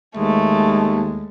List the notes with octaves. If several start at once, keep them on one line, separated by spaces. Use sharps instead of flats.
D#2 G#3 A3